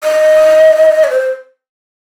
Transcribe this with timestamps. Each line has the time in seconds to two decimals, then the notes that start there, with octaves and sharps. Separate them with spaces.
0.03 D#5
1.04 C#5
1.10 C5